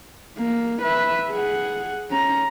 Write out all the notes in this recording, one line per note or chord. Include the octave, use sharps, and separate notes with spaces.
A#3
B4 E5
G#4 F#5
C#4 A#5